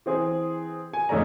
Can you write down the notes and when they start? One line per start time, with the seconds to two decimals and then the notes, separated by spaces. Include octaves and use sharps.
0.06 E3 C4 G#4
0.93 G#5
1.09 F2 G#2 A3 C#4 D5 A#5